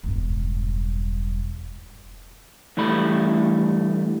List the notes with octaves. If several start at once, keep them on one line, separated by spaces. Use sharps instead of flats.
E1 G2
G2 E3 G3 A3 B5